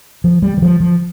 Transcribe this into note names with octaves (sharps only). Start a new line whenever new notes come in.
F3
G3
D#3
F3
F3